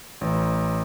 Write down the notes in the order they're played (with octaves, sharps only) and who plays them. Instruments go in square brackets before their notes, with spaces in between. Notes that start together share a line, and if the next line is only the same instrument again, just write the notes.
[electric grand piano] A1